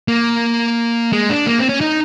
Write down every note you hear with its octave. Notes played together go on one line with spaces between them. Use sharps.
A#3
G#3
D4
A#3
C4
C#4
D#4